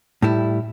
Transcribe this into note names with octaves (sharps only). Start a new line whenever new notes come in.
A2 G3 E4